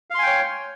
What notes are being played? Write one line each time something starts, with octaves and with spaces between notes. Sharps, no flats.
C#5 F5 G5 G#5 C6